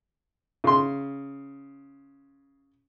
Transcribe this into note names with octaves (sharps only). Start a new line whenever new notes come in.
C#3 C6